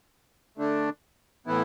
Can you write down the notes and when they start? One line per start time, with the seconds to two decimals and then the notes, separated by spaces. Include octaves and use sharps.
0.58 D3 A3 D4
1.46 A2 E3 B3 E4